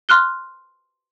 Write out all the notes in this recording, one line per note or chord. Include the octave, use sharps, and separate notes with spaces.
C6 F6 F#6 G7